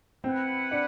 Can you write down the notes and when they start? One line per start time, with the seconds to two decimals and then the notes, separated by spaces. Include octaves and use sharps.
0.24 C4 E4 B4 F#5
0.71 D4